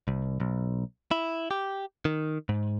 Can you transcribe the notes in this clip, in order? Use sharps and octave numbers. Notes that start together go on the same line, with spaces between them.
C2
B1
E4
G4
D#3
G#2